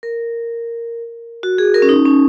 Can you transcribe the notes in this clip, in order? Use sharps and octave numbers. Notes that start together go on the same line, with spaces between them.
A#4
F#4
G#4
A#4
C#4
D#4
C#4